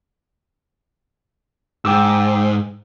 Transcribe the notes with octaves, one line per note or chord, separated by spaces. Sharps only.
G#2 G5 D6 E6